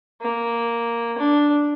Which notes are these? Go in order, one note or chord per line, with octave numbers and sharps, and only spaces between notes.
A#3
D4